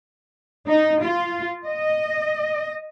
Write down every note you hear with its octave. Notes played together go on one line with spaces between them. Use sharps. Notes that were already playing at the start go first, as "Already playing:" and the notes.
D#4
F4
D#5